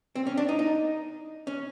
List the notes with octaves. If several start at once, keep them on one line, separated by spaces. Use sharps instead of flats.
C4
C#4
D4
D#4
D#4
C#4